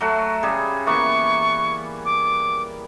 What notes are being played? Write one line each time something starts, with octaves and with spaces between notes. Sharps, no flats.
F#3 A3 F#4
C#3 G3 G#4
E3 A#3 B3 C#6
D6